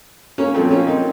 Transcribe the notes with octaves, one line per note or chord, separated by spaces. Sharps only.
A#3 C#4
A#2 F3 A3 C4
A#3 C#4
C4 D#4